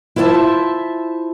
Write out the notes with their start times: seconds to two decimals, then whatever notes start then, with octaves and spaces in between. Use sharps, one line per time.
0.16 E4 F4 C5 E5 A5